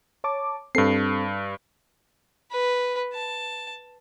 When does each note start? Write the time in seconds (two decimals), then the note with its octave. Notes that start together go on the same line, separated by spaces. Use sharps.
0.24 C#5 A5 D6
0.75 G2 C4 A4 C7
2.52 B4
3.14 A5